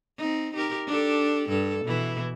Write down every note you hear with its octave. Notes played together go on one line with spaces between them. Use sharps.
C4 D#4
D#4 G4 A#4
D4 G4 A4
G2 A4
B2 E3 E4